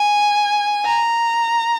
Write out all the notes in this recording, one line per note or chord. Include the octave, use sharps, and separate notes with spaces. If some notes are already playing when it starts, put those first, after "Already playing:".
Already playing: G#5
A#5